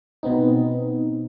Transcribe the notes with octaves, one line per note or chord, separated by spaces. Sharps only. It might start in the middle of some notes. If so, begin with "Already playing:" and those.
B2 B3 C4 D#4